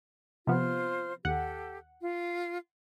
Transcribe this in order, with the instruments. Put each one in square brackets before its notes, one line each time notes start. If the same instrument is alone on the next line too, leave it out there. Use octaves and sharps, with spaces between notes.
[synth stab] C3 F3 B3 [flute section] F4 C5 F6
[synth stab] D#2 F#5 [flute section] G4 A4
[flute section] F4